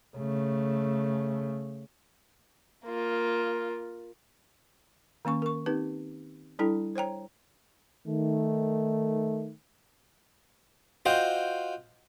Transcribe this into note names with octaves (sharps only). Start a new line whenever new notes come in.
C#3 A3
A#3 F4
D#3 A#3 C#4 C#6
A#4 C#6
C4 D#4 G4 B4
G3 D4 E4 A4 G5 A#5
C5 C#5 G5 A#5
D#3 A3
F4 F#4 C5 D#5 G5